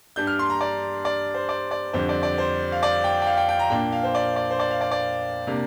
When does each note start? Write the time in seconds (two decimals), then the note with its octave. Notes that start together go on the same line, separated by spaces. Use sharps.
0.16 G2 G3 D4 G6
0.27 F6
0.39 C6
0.50 A#5
0.61 D5
1.05 D5
1.34 C5
1.49 D5
1.71 D5
1.93 F2 D3 G3 C5
2.09 D5
2.23 D5
2.38 C5
2.72 F5
2.83 D5
3.04 G5
3.22 G5
3.26 F5
3.37 G5
3.49 G5
3.59 A#5
3.70 A#2 A#3 D4 G5
3.92 F5
4.03 C5
4.15 D5
4.36 D5
4.51 C5
4.59 D5
4.70 F5
4.81 D5
4.91 D5
5.47 C3 A#3 D4